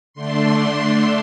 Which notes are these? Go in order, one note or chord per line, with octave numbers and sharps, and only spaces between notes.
D3 A3 D4 C6